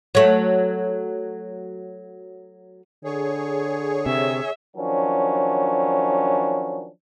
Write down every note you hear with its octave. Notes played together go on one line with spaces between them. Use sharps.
F#3 A3
D3 G#4 C#5
C3 E5
D#3 F3 F#3 C#4 D4